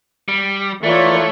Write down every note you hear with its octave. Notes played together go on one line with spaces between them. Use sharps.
G3
E3 A3 F4 A#4 C#5 D5